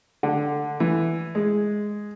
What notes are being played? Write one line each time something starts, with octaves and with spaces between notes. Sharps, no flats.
D3
E3
G#3